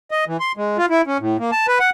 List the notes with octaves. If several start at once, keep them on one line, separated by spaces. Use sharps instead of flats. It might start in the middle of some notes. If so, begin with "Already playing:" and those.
D#5
E3
C6
G#3
F4
E4
C#4
A2
A#3
A5
B4
F#5